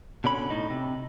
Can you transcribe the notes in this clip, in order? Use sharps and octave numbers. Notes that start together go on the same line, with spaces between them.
B2 D3 C#4 B5
A2 D#4
C3